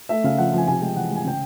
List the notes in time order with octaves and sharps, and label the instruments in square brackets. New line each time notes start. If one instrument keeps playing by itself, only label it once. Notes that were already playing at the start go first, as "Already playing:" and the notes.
[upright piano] A3 E5
C#3 F5
F3 F#5
F3 G#5
C3 G#5
G#3 G5
E3 F#5
G#3
G#5
C#3 G5